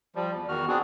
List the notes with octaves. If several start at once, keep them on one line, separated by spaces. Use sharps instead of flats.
F3 G3
E2
E2 D#3 F#4 F6
B3 C4 D4 F#4 G#4